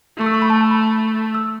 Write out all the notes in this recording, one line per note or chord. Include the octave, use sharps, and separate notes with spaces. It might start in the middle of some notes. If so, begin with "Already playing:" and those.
A3 C#6
E6
C#6
B5
A5
A5
B5
B5
E6